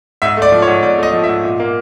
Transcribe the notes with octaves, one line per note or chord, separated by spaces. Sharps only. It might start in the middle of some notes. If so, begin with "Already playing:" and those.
G#2 E5
A3 D5
F3
C#5
G#2
G#2 D5
A3 D#5
F3
E5
G#2
A#2
A#3